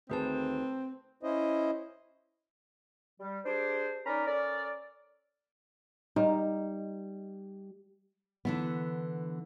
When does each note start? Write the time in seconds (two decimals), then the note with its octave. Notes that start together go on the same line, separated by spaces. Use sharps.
0.10 D2 D#3 A3 C4 G#4 B4 A5
1.23 C#4 E4 C5 D#5
3.20 G3
3.45 D4 G4 G#4 C5
4.06 C#4 D#4 A#4 D5 A#5 B5
4.27 C#4 A4 A#4 D5
6.16 G3 D#4
8.45 D3 E3 B3